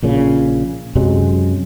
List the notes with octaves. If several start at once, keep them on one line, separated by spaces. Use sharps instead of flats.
A#1 A#2 C#3
F#2 C3 F#3 G#3